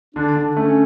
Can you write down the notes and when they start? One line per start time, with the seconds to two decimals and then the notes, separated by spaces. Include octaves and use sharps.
0.15 D3 D4
0.36 D3
0.56 A3 C#4